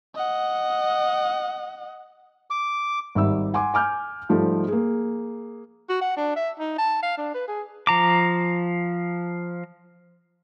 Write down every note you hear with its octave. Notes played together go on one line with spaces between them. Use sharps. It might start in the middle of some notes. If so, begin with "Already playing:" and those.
D#5 F#5
D6
G#1 G3 E5 E6
F#5 G#5 C6 D6
G#5 D6 F6 G6
G#2 F3 G3 A3
A#3 G#4
F#4
F#5
D4
E5
D#4
A5
F5
D4
B4
G#4
F3 A#5 D6